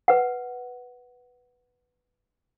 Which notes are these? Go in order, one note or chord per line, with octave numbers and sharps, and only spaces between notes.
B4 F#5